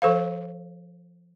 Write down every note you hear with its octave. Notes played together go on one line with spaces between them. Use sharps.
F3 A4 C5 F5